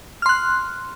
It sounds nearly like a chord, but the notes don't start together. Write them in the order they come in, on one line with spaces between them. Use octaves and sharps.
F6 C6 F#6